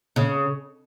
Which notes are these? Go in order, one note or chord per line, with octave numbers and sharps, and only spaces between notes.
C#3